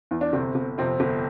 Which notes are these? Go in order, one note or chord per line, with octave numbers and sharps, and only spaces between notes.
E2
D4
G1 C3 C4
G1
F2 C3 C4
G1